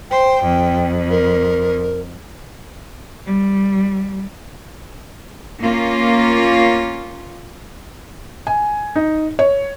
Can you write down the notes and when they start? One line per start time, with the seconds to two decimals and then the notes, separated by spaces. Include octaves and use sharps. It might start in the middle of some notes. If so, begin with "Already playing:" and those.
0.11 C5 G5
0.44 F2
1.10 A#4
3.27 G3
5.61 A#3 C#4 F4
8.47 G#5
8.96 D#4
9.39 C#5